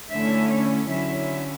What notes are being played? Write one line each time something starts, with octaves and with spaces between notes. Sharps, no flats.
D3 A3 C#4 E4 E5
C#5
D3 F#3 C#4 E4 E5